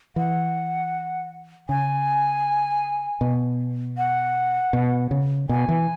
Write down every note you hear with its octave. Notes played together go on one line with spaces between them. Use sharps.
E3 F#5
C#3 G#5
B2
F#5
B2
C#3
B2 G#5
E3